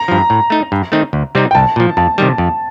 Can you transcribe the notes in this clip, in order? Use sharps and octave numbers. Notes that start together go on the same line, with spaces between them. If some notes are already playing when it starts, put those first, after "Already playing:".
Already playing: A#5
G2 F3
A2
A3 D#4
G2
D#3 A3 C4 D#4
D2
C3 G3 C4 D#4
G5
C2 A5
A#2 F3
F2 A5
C3 D#3 G3
F2